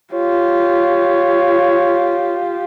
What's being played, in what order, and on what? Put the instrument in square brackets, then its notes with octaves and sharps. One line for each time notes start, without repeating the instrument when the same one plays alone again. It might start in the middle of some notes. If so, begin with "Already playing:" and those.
[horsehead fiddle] F4 G4 [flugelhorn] C#5